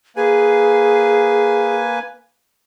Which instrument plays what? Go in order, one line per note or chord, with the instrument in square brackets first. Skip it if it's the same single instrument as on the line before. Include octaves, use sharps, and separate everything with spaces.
[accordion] A#3 B4 G#5 [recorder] G#4